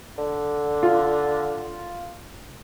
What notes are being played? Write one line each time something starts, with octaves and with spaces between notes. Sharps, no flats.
D3
F4